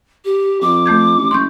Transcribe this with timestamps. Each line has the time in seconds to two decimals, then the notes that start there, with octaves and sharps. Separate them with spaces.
0.25 G4
0.61 F2 D6
0.86 A3 G6 G#6
1.17 A1
1.31 F#1 C6 C#6 G6